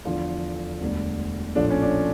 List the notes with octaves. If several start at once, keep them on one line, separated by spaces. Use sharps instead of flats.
E2 D3 F3 A3 F4
E1 D2 D3 G3
A#1 A2 F3 A3 D4
C#4
D4